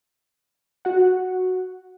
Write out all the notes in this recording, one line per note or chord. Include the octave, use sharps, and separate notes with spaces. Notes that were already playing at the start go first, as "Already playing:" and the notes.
F#4 F#5